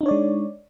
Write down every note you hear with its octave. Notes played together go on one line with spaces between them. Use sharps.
G#3 D4 D#4 C#5 D5